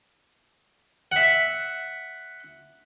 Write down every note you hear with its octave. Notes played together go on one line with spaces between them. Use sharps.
E5 F#5